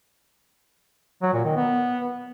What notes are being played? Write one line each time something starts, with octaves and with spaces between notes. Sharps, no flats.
F#3
A#2
D#3
B3